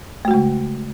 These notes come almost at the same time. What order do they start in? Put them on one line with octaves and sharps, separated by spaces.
A3 F#4 G#3 C#3